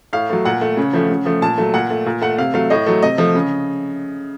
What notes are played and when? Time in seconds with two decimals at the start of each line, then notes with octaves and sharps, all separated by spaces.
0.13 A2 F5
0.30 F#3 A3
0.45 A#2 F#5
0.61 A3
0.77 C#3
0.93 F3 A3
1.09 C#3
1.25 F3 A3
1.42 A#2 A5
1.58 F#3 A3
1.74 A#2 F#5
1.90 A3
2.06 A#2
2.22 A3 F#5
2.38 C3 F5
2.54 F#3 A3 F5
2.70 A2 D#5
2.86 F#3 A3
3.02 C3 D#5
3.18 F3 A3
3.35 C#3